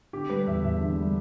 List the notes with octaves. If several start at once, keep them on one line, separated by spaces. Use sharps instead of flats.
D3 G4
G3 B4
E2 E5
E2 E5
D3
G3